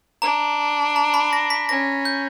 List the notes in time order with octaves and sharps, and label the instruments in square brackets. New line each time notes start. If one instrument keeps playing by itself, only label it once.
[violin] D4 [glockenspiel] A#5
[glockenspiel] A#5
B5
A#6
B6
[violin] C#4 [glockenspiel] A#6
[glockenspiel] G6